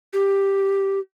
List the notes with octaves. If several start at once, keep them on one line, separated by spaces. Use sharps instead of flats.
G4